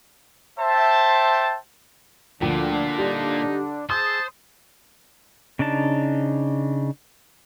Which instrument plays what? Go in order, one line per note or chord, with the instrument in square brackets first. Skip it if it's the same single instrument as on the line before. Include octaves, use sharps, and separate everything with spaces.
[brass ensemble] C5 E5 G5 A5
[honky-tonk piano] D2 F3 G5 [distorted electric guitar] A#2 [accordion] D3 D4
[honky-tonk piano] G3 [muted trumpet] D#4
[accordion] G#4 E6 [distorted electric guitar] C5 [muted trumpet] A5 [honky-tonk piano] D#6
[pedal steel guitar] C#3 D4 D#4 A5